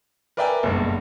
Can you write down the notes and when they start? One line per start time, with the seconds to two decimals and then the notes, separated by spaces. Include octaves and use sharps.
0.37 A#4 B4 D5 E5 G5 G#5
0.63 F#1 B1 G2